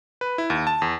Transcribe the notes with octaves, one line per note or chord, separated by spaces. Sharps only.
B4
E4
D#2
A5
E2